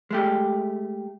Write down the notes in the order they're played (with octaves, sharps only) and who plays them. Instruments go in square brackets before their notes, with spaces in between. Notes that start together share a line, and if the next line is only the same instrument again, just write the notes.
[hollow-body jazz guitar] G#3 A3 G4